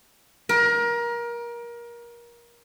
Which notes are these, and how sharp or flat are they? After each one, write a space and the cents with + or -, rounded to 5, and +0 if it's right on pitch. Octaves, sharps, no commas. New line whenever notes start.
A#4 +25